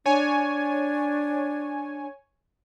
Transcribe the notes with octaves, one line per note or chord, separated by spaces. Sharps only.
D4 C#5 G#5